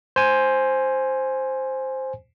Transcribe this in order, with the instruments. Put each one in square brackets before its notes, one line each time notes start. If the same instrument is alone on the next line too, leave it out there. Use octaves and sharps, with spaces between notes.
[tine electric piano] C5 G#5